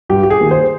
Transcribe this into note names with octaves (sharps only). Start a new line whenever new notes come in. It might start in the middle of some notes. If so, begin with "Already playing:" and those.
G2 G4
G4
G#4
D#3 A#3
C5